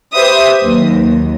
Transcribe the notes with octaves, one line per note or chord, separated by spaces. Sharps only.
G4 B4 C5 E5 D#6
D#2 F#3